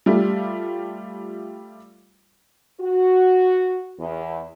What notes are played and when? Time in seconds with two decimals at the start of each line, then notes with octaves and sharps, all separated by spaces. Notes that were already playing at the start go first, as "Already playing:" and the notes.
0.06 G3 A3 F4
2.80 F#4
3.98 E2